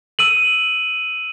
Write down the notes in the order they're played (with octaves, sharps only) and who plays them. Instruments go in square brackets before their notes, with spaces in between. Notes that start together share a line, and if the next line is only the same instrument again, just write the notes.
[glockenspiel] E6 D#7 F#7